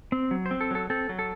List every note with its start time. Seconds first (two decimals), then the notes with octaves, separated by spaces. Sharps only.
0.12 C4
0.31 F#3
0.46 C5
0.51 C4
0.61 A4
0.71 F#3 A4
0.90 C4 A4
1.09 F#3
1.19 A4